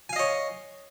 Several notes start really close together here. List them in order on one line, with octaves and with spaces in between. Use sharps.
G#5 F5 D#5 C#5